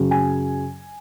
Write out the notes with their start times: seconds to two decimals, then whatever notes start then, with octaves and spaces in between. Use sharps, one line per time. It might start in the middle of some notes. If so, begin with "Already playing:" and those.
Already playing: F#2 C#3 F#3
0.11 G#5